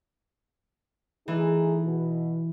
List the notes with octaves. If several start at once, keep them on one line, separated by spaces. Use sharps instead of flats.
E3 A3 D#4 G#4
B2